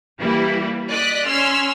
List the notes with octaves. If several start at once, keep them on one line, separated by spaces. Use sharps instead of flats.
E3 G3 A#3 E4
D5 D#5 F#6 B6
C#4 C6 E6 F6